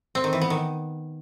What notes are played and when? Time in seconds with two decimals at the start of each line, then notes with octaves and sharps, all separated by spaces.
0.15 C4
0.24 D#3
0.33 E3
0.41 B3
0.50 D#3